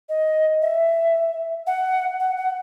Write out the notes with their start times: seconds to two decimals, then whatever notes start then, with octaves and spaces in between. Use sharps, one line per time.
0.09 D#5
0.62 E5
1.67 F#5
2.20 F#5
2.37 F#5